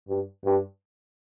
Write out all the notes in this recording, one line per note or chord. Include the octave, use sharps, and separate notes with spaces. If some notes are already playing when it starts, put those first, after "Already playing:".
G2
G2